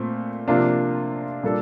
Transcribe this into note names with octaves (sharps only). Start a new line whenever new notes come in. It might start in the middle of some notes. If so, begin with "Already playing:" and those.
Already playing: A#2 A3 C4
C3 F3 A#3 D4 F4
A#2 G3 A#3 D4 A4